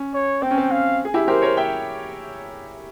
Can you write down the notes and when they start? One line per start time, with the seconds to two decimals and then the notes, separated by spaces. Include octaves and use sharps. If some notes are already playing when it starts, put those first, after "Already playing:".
Already playing: C#4
0.14 C#5
0.42 C4 G5
0.51 C#4
0.58 C4
0.70 C#4 F5
1.05 G#4
1.14 E4 G4
1.28 G4 A#4 C5
1.42 A#4 C#5
1.57 E5 G5